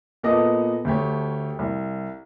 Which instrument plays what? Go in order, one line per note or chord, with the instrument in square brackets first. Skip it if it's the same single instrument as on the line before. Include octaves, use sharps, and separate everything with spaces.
[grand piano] A#2 B3 A4 D#5 D6
D2 A3 G4 C#5
C2